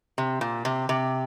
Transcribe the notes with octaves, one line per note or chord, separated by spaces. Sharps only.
C3
A#2
C3
C3